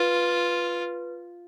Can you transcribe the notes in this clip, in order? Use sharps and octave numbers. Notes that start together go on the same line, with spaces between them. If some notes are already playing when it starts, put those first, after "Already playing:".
Already playing: F4 B4